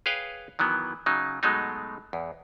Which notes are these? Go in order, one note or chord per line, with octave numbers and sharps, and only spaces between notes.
G#4 B4 C#5 F5 G5
D#3 E3 F#3 B3
C#3 F#3 D#4
B2 F#3 G#3 A3 D#4
E2